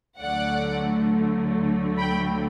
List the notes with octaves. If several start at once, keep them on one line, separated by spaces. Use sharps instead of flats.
D2 D3 F#3 A3 D5 F#5
G5 B5